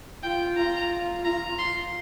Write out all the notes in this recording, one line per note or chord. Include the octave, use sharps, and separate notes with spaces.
F4 G5
F4 A#5
F4 A#5
C6